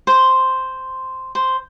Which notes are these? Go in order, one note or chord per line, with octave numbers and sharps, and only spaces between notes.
C5
C5